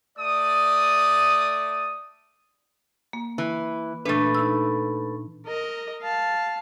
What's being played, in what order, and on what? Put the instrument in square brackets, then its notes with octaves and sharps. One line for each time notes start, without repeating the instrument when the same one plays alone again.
[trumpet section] A3 D5 D#6
[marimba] A#3
[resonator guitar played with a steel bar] E3
[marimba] A#2 E3 D4 [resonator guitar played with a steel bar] A3 B4
[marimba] D#4 E6
[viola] A#4 D#5
F5 A5